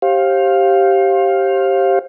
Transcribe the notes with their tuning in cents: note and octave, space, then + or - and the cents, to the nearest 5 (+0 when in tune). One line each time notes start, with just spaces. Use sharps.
G4 -10 C5 +35 F5 +0